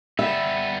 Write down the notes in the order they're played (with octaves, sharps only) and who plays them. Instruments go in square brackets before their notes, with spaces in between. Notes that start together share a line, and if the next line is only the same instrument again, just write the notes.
[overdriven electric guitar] G3 B3 [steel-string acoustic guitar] E5